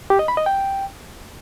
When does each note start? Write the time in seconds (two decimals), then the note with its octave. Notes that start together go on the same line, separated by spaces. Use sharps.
0.10 G4
0.19 D#5
0.28 B5
0.37 D#5
0.46 G5